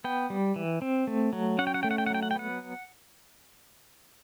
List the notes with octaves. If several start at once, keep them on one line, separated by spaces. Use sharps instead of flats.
B3 G5
G3
E3
C4
A3
F#3
C#4 F#5
G5
F#5
A3 G5
F#5
G5
F#5
F#3 G5
F#5
G5
B3 F#5